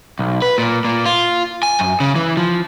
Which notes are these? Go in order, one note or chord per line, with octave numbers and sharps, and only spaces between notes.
B1
B4
A#2
A#2
F4
G#5
F#2
C#3
E3
F3